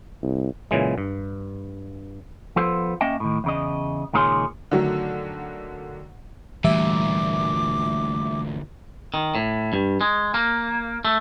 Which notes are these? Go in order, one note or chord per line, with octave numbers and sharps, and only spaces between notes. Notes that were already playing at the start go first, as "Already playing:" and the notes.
C2
A#2 C#3 E3 G#3
G2
F3 B3 F4 A4 C5
A#3 C#4 D#5 E5 G5
A2 D#3
E2 C#3 D#5
C#2 A#2 D#3 G#4 C#5 C6
D3 D#3 F#3 A3
D2 A#2 E3 G3 A3 E5 D6
D#3
A2
G2
G#3
A#3
A3